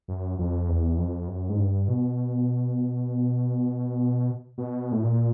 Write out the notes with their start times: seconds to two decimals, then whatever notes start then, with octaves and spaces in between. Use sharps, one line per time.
0.08 F#2
0.39 F2
0.68 E2
0.98 F2
1.28 F#2
1.49 G#2
1.59 G2
1.88 B2
4.58 B2
4.92 A2
5.03 A#2